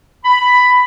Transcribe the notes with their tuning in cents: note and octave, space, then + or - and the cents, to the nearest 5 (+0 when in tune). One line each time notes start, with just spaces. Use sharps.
B5 +10